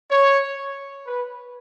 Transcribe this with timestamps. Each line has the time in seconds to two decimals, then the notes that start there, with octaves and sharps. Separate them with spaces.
0.10 C#5
1.06 B4